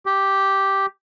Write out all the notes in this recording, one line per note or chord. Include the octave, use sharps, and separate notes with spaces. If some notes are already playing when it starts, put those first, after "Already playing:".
G4